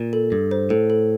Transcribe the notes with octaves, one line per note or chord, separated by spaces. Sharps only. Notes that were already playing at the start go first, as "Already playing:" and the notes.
Already playing: A#2
A4
G2 A4
C5
A2 A4
A4